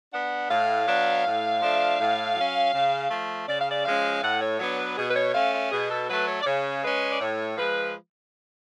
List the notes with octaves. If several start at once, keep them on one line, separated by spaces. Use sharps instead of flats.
B3 D4 F#5
A2 F5
F#3 B3 D4
A2
F3 A3 D4
A2
F#3 C#4
C#3
F3 A3
C#3 D5
F5
D5
F3 G#3 C#4 F5
A2 F#5
C#5
F#3 B3 D4 C#5
B4
B2 G#4
B4
C#5
A3 C#4 F5
F5
B2 G#4
A4
F#3 A3 B4
C#5
D5
C#3 C#5
G#3 C#4 B4
D5
A2 C#5
F3 G#3 B4